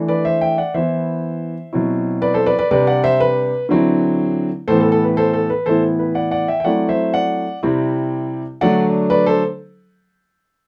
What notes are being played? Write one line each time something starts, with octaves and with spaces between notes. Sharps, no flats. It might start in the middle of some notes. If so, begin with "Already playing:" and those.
Already playing: E3 A3 D4
B4 D5
C5 E5
E5 G5
D5 F#5
E3 B3 E4 C5 E5
B2 F#3 C4 E4
B4 D5
A4 C5
B4 D5
B4 D5
C3 G3 D4 B4 D5
D5 F#5
C5 E5
B4
D3 F#3 C4 E4
A2 E3 B3 A4 C5
A4
A4
B4
A4 C5
A4
B4
A2 E3 B3 E4 A4 C5
B4
D5 F#5
D5 F#5
E5 G5
G5
F#3 A3 C4 E4 D5 F#5
C5 E5
D5 F#5
C3 G3 C4 E4
D3 F#3 A3 D4 D5 F#5
B4 D5
A4 C5